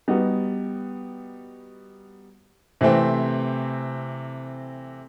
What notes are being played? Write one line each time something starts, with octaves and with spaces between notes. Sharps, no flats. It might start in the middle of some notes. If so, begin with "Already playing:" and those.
G3 B3 D#4 F#4
C3 E3 A3 C4